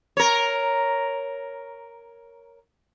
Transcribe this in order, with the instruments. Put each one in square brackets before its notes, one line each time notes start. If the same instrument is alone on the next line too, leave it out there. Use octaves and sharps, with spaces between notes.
[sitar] A#4 C#5